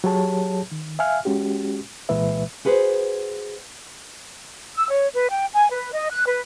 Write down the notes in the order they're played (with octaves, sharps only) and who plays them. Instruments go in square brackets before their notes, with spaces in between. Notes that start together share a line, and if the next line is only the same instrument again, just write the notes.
[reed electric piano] F#3 G4 G#4 C#5 A5
D#3
E5 F5 G#5 F6
G#3 C#4 F#4 G4
C2 A#2 E3 G#3 B4 E5
[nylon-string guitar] F#4 G#4 B4 C5
[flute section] E6
C#5
B4
G5
G#5
B4
D#5
F#6
B4